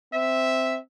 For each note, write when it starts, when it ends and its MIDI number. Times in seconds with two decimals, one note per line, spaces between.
0.13 0.78 60
0.13 0.77 76